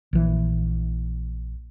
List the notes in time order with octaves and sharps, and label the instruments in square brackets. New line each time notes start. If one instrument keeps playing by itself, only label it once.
[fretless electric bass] A#1 E3